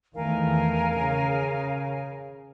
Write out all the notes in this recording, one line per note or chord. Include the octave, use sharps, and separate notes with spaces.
E2 D#3 A3 A#4 F5 G#5
C#3